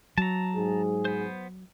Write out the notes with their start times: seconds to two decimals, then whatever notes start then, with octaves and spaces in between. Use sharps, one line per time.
0.18 F#3 A5 A#5
0.55 G#2 G#4
1.05 B3 C5